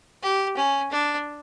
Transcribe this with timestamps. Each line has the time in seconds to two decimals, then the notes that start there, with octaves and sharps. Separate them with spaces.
0.23 G4
0.57 C#4
0.91 D4